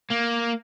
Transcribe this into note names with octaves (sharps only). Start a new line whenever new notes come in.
A#3